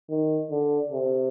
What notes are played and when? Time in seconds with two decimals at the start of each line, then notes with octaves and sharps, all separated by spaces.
0.10 D#3
0.51 D3
0.92 C3